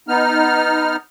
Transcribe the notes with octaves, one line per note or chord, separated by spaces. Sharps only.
B3 D#4 F6